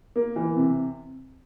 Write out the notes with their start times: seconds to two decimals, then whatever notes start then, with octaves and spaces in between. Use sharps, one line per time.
0.16 A#3
0.36 E3
0.56 C3